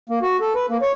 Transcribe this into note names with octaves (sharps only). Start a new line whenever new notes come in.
A#3
F#4
A4
B4
A#3
C#5